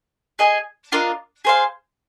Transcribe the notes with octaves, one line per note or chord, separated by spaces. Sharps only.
G#4 D#5 G#5
D4 F4 A#4 D#5
G#4 C5 F5